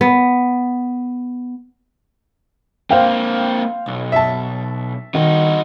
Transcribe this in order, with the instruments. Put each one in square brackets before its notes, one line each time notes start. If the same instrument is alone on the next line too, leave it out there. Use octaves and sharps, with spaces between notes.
[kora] B3
[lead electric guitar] A#3 C4 [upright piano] C5 F5 G5
[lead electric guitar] B1
[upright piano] E5 A5
[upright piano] D#3 [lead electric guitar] D#4 F#4